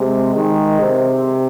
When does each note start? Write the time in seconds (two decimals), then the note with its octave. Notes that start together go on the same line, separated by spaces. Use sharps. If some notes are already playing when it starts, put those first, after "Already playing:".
Already playing: C3 G#3
0.35 D#3 G#3
0.81 C3 C4